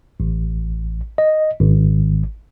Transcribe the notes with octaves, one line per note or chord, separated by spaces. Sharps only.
A1
D#5
G#1